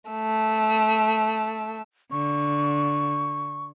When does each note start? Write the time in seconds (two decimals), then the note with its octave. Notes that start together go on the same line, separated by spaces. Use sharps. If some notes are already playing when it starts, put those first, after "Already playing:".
0.10 A3 E6
2.11 D3 C#6